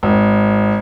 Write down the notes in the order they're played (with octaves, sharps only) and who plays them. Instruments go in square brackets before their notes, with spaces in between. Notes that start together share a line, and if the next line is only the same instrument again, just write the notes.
[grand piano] G#1